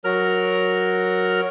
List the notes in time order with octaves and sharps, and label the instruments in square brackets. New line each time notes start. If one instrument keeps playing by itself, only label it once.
[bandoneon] F#3 A#4 F6